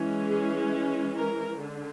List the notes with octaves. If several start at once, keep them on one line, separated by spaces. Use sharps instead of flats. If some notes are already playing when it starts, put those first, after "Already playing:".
Already playing: E3 G#3 C#4
G#4
A#4
D3